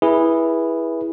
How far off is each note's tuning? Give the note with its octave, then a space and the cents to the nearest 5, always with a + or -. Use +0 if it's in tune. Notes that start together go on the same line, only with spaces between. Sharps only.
E4 +0 G#4 -15 B4 -25